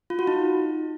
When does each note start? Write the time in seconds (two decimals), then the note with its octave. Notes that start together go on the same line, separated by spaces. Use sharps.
0.10 F4
0.19 F#4
0.27 D#4